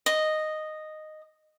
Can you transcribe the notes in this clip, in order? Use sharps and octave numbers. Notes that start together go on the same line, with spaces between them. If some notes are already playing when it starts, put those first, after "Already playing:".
D#5